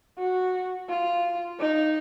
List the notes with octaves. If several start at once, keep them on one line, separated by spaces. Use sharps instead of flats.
F#4
F4
D#4